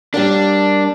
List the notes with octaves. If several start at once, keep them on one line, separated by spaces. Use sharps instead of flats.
G3 A#3 D4 A#4